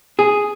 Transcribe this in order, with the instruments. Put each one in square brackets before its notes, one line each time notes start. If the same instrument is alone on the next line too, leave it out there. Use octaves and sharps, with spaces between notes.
[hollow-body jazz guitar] G#4